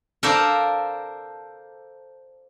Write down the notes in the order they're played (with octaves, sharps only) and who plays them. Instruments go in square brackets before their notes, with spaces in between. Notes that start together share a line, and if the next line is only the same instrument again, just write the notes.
[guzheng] A4 A#4 C5 D5 F5